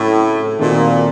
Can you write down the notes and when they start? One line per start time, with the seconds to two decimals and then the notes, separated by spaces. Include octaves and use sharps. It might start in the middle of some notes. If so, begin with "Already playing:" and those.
Already playing: A2 C#3 F#3 C4
0.59 A#2 D#3 A3 C4 D#4 F#4